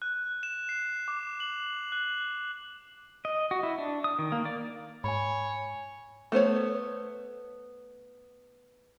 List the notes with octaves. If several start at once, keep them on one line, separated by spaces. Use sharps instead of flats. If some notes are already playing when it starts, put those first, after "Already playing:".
F#6
E7
C7
D6
F#7
F#6
D#5
F#4
E4
D4
D#6
D#3
A#3
D5
G#2 C#5 G#5 B5
A3 B3 C5 C#5